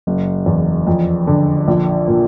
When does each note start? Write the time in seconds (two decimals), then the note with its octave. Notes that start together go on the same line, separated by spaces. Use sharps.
0.07 F#1
0.46 E2
0.87 F2
1.27 D3
1.68 A#1
2.08 A#2